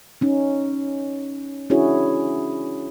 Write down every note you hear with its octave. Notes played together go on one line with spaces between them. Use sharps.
C#4 D#4
C#4 D4 E4 F#4 G#4 C#5